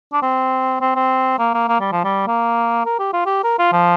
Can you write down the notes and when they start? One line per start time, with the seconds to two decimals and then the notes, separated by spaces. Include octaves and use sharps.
0.13 D4
0.22 C4
0.81 C4
0.95 C4
1.39 A#3
1.54 A#3
1.68 A#3
1.80 G3
1.92 F3
2.04 G3
2.27 A#3
2.86 A#4
2.99 G4
3.13 F4
3.26 G4
3.44 A#4
3.59 F4
3.73 F3